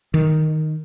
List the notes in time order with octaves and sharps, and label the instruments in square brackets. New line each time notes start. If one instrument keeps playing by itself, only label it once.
[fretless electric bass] D#3